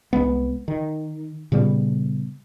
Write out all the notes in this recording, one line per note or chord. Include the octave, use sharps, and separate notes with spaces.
C2 G#2 G#3 B3
D#3
A#2 C#3 G3 B3